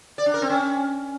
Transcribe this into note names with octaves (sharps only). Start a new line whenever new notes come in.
D5
D4
A#4
C4
C#4